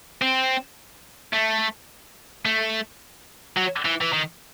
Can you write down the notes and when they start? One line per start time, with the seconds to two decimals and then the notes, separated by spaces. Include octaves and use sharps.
0.22 C4
1.33 A3
2.45 A3
3.57 F#3
3.85 E3
4.01 E3
4.13 D#3